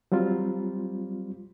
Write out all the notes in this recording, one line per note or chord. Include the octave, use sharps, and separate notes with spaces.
F#3 G3 C4 F4